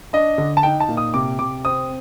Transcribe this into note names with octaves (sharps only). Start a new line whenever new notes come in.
D4 D#5
D3
A5
D#4 G5
A5
A#2
D#6
C3 D6
C3 D6
C4 D#6